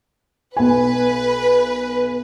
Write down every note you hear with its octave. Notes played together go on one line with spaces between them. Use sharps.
B1 B4 G#5